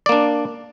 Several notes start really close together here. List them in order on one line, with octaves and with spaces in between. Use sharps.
D5 A#3 D4